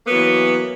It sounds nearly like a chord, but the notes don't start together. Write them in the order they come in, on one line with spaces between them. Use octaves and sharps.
A#3 B3 F#3 E3